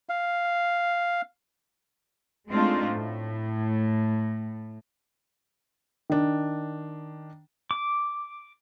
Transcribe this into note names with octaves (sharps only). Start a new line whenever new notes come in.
F5
G#3 A3 C4 D4 D#4 F4
A2
D#3 D4
D6